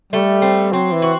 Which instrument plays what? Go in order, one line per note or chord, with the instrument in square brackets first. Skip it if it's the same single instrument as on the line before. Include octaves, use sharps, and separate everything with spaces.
[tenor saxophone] G3 [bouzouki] A3
[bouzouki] C4
[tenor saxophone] F#3 [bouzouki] C4
[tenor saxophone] E3
[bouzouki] F#4